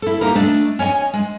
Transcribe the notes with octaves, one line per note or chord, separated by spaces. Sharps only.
E4 A4
A#3 D#4 G4 A#4
A3 D4 D#5
C#4 C#5 D#5 G#5
G#3